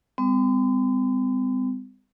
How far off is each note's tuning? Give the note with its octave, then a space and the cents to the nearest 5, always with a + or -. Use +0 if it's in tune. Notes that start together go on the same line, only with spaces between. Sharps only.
G3 +35 C4 -45